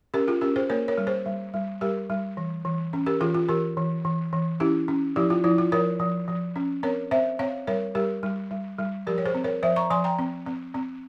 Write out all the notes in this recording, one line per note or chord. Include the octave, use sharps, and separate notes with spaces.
C#4 G4 A#4
F4 G#4
C#4 G4 A#4
G#4 C5
A#3 A#4 C#5
A#4 C#5
G3
G#4 C5
G3
G3
G3 G4 A#4
G3
E3
E3
C#4
G4 A#4
E3 F4 G#4
F4
E3 G4 A#4
E3
E3
E3
C#4 E4 G4
C#4
F3 E4 G4
F4
F3 E4
F4
F3 A#4 C#5
F3
F3
C#4
C4 A#4 C#5
C4 C5 E5
C4 C#5 F5
G3 A#4 C#5
G3 G4 A#4
G3
G3
G3
F3 G4 A#4
C#5
G#4 C5
C4
A#4 C#5
F3 C5 E5
A#5 C#6
F3 G#5 C6
G5 A#5
C4
C4
C4